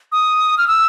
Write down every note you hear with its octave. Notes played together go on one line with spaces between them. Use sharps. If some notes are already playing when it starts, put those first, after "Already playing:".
D#6
F6
E6